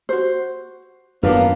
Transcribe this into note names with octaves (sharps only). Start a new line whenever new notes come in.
F#4 C5
F#2 D#3 F#3 A#3 B3 D4 F4